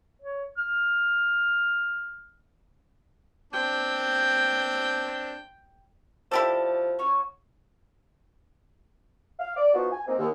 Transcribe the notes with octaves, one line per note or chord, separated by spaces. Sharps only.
C#5
F6
C4 D4 G5
F3 E4 G4 A4 D5
C#4 F#4 C#5
F5
D5
F3 B3 D#4 F4 F#4
G#5
A#3 C4 D#4
D#2